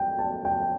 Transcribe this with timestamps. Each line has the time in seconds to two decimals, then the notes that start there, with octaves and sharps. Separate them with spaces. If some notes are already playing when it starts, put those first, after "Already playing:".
Already playing: G5
0.19 A5
0.45 G5